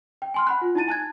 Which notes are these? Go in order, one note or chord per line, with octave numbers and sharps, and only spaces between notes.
G5
G#5 C6 F6
F#5 B5 F#6
F4
D#4 E4 A5 A6 D#7
G#5 A5 F#6 G#6